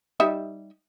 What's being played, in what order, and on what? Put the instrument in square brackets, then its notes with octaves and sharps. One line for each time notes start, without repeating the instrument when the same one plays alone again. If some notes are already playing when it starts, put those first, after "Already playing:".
[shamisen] G3 D#4 E5